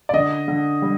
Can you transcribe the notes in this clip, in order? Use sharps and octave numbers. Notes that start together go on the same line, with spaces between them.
D5
D3 D#5
D3
G3